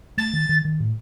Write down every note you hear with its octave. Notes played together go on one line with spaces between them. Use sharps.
A3 A6
D#3
D#3
D#3
A2